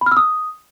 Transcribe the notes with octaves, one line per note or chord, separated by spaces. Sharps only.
B5
F6
E6
D#6